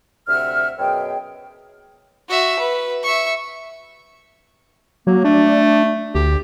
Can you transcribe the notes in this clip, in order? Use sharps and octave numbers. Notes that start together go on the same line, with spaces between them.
D2 C3 E5 F#5 F6
F#2 B2 G#4 G5
F#4 E5
B4
E5 C#6
F#3 A#3
A3 D4
D2 G4